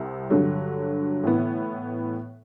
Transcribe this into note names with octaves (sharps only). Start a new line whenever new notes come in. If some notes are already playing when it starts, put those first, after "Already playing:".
Already playing: C2 C3
G2 D3 F#3
A2 E3 B3